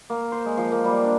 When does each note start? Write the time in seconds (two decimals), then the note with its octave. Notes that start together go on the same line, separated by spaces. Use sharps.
0.10 A#3
0.32 C5
0.46 G#3
0.57 F3
0.72 A#3
0.84 G3
1.04 D4